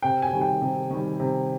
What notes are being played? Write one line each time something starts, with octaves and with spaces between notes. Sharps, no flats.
C3 G5
G#5
D#3 G3
G5
C3
D#3 G3
C3